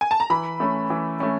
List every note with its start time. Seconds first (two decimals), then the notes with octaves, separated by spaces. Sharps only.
0.01 G#5
0.11 A5
0.20 A#5
0.30 E3 B5
0.60 A3 C#4
0.90 E3
1.20 A3 C#4